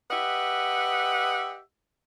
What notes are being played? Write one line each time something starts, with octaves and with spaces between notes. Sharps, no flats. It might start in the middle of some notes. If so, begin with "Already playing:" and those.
G4 B4 D#5 E5 F#5